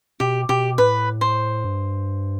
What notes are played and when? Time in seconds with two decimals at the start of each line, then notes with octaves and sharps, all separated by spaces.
0.20 B2 G4
0.49 B2 G4
0.78 A2 B4
1.21 C5
1.64 G2